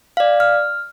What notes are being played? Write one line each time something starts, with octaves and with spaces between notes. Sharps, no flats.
D5 F5
F6